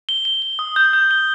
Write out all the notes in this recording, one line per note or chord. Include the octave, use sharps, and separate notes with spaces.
G7
G7
G7
D#6
G6
G6
G7